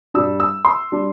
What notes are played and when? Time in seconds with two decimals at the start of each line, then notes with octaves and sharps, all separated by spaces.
0.14 G2 G3 D4 E6
0.40 E6
0.65 C6
0.92 G3 D4